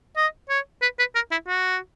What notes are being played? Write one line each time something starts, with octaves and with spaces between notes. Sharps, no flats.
D#5
C#5
B4
B4
A#4
E4
F#4